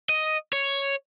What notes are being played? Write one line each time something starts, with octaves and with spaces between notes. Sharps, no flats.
D#5
C#5